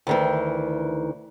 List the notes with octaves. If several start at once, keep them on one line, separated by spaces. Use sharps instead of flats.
D2 D#3 E3